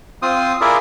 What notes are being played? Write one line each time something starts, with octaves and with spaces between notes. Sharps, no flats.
C4 F4 C5 D#6
E4 F4 G#4 A#4 D5 E5